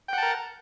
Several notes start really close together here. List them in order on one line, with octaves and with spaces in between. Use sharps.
G5 F#5 A5 A#4